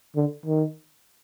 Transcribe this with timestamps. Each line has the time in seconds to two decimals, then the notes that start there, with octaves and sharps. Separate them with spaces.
0.16 D3
0.46 D#3